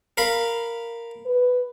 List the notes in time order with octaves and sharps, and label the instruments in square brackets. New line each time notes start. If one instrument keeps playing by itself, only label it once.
[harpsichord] A#4 F5 B5
[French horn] B4